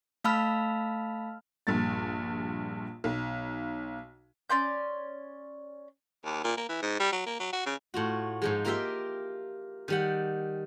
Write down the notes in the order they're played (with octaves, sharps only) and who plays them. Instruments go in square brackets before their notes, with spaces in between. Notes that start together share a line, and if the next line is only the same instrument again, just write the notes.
[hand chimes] A3 F5 A5 B5 E6 F6
[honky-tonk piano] A#1 G2 A6
B1
[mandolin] C#4 D5 C6 G6
[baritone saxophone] D#2
A#2
A#3
E3
G#2
G3
F#3
A#3
F#3
F#4
C#3
[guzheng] A2 F4 F#4
G#2 F3 G#3
A#3 F4 G4 A#4 E5 G5
D#3 G3 F#5